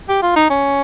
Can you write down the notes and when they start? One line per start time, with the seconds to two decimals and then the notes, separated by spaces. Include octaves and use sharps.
0.09 G4
0.22 F4
0.36 D#4
0.50 C#4